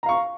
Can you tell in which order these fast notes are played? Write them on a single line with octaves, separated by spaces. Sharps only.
A#5 F5 C#6